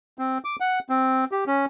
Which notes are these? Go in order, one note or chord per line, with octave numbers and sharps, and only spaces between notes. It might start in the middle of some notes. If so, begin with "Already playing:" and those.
C4
D6
F#5
C4
G4
C#4